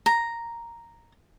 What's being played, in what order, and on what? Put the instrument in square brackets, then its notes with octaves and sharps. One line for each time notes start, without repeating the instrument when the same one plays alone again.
[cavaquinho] A#5